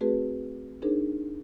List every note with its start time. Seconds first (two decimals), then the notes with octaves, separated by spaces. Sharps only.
0.01 A3 C4 F#4 G#4 B4
0.82 D4 D#4 G#4 A#4 C5